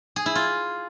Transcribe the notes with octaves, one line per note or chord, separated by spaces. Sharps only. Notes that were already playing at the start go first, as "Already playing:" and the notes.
G#4
E4
F4